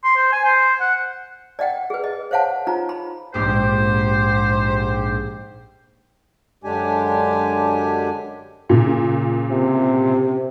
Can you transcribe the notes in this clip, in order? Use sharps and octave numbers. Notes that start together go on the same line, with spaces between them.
C6
C5
G#5
C5
F#5
D5 D#5 F#5 G5
G#4 B4
D#5
C5 C#5 F5 F#5 A5
D#4 F4 A#5
B5
A#1 G#2 G4 C5
F#2 D3 G#3 D4 G4 G#5
A#2 C#3
C3